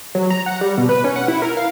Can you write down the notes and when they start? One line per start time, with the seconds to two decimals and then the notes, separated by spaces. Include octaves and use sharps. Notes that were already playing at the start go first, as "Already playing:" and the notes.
0.15 F#3
0.30 A#5
0.46 F#5
0.61 G3
0.77 B2
0.89 B4
1.04 C#4
1.16 F#5
1.28 E4
1.42 A#4
1.57 F5